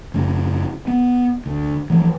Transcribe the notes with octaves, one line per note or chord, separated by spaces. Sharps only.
F#1 F#2 A3
B3
D2
E3 F3 A3